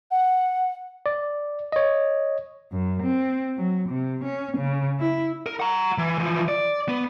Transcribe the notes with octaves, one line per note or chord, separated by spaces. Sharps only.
F#5
D5
C#5 D#5
F#2
C4
F#3
C3
C#4
C#3
E4
A#4
F#5 A#5
E3
E3 F3
D5
B3